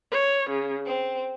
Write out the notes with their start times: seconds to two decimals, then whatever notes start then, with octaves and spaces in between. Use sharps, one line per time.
0.11 C#5
0.49 C#3
0.86 C4